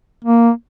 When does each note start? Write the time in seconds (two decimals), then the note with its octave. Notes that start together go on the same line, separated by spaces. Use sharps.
0.24 A#3